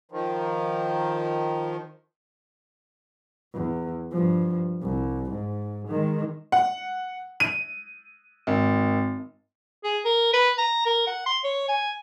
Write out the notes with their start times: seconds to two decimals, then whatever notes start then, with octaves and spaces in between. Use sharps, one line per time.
0.12 D#3 F3
3.54 E2
4.11 G2 F3
4.82 C2
5.32 G#2
5.88 D#3 G#3
6.52 F#5
7.40 D#7
8.47 G#1
9.84 G#4
10.05 A#4
10.34 B4
10.58 A#5
10.86 A#4
11.07 F#5
11.26 C6
11.44 C#5
11.68 G#5